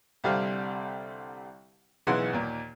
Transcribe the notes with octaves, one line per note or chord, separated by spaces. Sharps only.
C2 D3 G3 C4 F5
B1 C#3 E3 F#5 C6
D#2 A#2